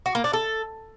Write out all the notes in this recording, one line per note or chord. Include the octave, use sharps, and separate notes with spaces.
F#4
A#3
D4
A4